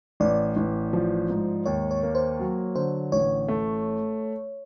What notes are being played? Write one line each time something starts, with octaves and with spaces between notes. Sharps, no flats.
A1 D5
A1
F3
G#2
D#2 C#5
C#5
A#3
C5
F#3
D3 C5
A1 C#5
A3